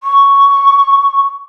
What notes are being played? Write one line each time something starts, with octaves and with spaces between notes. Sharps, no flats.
C#6